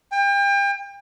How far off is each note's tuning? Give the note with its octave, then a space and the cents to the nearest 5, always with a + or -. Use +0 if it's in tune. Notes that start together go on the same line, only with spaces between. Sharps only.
G5 +35